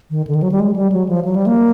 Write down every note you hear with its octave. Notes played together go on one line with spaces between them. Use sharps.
D#3
D3
D#3
F#3
G3
G#3
G3
F#3
F3
F#3
G3
A#3